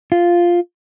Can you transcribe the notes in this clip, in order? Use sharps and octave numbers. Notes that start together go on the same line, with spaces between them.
F4